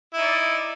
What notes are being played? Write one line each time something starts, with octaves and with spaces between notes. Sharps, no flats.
D#4 E4 D5